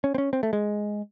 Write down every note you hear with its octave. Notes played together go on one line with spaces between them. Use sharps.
C#4
C4
C#4
C4
A3
G#3